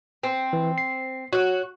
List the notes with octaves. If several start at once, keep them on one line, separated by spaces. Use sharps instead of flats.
C4
E3
C7
F#4 C#5 F#6